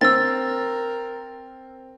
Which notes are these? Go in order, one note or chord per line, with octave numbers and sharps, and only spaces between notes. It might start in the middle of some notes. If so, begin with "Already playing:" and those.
C4 A#4 E6 A6